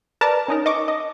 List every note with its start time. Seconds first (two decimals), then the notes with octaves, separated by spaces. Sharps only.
0.21 A#4 B4 D5 A5 A#5
0.48 C#4 D#4 A#4
0.66 D#5 C#6 D6
0.88 D#5